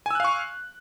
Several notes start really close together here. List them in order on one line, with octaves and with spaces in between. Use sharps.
G#5 E6 F#6 F5 C#6